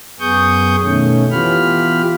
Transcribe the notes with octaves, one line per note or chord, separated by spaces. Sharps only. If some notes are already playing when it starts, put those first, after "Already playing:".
F#2 B3 G#4 C#6 D#6 G6
B2 D#3 A3 C#4
E3 B3 F4 G4 B5 F6